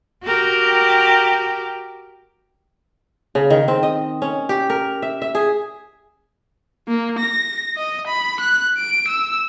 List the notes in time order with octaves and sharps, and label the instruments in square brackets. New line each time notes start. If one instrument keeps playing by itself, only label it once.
[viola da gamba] F#4 G4 A#4
[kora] C#3
D#3
C4
D#5
C#4
G4
A#4
E5
E5
G#4
[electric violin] A#3
A#6
D#5
B5
F#6
D7
E6